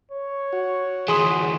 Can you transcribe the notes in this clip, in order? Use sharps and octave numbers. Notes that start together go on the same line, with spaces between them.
C#5
F#4
D2 E3 G#4 C6 D#6